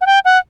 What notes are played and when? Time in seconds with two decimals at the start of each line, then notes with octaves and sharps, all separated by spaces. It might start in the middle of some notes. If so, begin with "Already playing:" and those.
0.01 F#5
0.06 G5
0.25 F#5